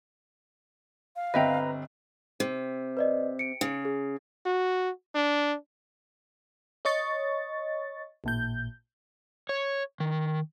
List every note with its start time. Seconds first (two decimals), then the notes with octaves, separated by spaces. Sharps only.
1.16 F5
1.34 G1 C4 B4 D#5 E5 G5 A#5
2.40 C3
2.97 B4 D5 D#5
3.39 C#7 D7
3.61 C#3
3.85 G#4
4.46 F#4
5.15 D4
6.85 C#5 D#5 C#6 A6
8.24 A1 A#2 G6
9.49 C#5
10.00 D#3